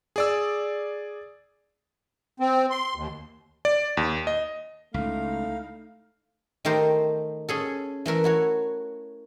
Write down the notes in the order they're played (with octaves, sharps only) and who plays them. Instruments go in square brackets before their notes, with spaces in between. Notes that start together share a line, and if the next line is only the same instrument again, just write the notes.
[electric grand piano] G#4 D5 E6
[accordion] C4
C6
D#2
[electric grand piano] D5
D#2
D#5
[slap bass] C#2 [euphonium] A3 [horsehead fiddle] D#4 E4 [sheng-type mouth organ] F5
[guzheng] D#3 A3 G4 A#4 C5 A5
C#4 G#4 A4
E3 A3 A#4 E5
E4 F#4 C#5